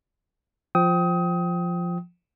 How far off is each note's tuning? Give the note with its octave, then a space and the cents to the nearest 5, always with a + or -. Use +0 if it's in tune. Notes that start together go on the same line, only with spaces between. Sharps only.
F3 +0 G5 -15 D#6 +25